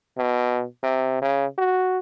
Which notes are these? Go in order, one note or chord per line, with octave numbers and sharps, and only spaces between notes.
B2
C3
C#3
F#4